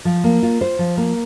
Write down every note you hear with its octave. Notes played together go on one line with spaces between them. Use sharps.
F3
A#3
F4
C5
F3
A#3